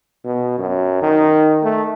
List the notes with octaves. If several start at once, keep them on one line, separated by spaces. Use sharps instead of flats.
B2
F#2
D#3
A3